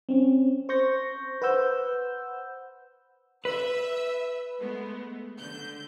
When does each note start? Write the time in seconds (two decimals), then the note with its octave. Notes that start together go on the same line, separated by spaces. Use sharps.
0.09 C4 C#4
0.69 C5 C#6 G6 A#6
1.42 B4 C5 F#5 E6 G6
3.45 B4 E5 E6
4.60 G#3 A3 B3
5.39 D3 G6